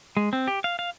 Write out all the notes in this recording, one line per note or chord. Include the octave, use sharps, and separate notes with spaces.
G#3
C4
G4
F5
F5